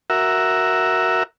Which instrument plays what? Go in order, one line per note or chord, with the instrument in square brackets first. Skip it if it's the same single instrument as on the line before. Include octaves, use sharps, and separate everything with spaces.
[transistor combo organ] F#4 A#4 E5